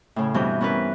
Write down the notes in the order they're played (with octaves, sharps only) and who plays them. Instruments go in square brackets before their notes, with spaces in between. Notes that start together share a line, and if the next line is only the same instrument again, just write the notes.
[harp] A2 C#3
G2 B2 E3 C4 G6
B3 C#4 E4 A#4 B4